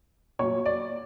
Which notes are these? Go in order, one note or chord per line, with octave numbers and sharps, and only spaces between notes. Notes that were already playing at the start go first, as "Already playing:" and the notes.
A#2 F#3 C#5
D5